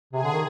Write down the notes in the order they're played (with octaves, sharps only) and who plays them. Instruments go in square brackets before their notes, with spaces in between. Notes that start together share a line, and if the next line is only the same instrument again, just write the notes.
[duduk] C3 [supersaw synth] G#4
[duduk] D3
D#3